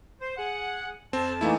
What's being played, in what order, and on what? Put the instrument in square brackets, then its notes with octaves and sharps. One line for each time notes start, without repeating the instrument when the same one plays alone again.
[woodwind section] C5
G#4 F#5
[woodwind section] F2 A5 [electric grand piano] C4
[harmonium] E3 A#3 D#4 [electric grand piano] A3 E4